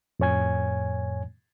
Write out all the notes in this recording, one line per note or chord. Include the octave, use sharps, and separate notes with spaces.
F2 A2 C#5 G#5 G#6